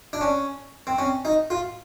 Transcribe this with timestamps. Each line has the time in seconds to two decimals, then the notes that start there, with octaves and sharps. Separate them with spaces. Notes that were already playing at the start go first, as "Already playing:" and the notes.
0.13 D4
0.21 C#4
0.87 C4
0.99 C#4
1.25 D#4
1.50 F4